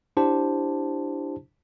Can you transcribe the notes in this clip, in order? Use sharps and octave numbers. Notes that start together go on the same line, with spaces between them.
D4 E4 G4 C5 A5